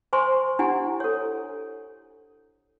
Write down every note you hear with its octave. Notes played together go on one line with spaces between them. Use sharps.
C5 G#5 C6 C#6
D4 E4 G4 F#5 G#5
A4 C#5